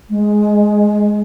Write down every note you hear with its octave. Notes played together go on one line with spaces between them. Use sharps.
G#3